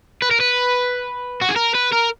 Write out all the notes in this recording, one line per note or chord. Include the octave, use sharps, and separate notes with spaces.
B4
A#4
B4
F#4
G#4
A#4
B4
A#4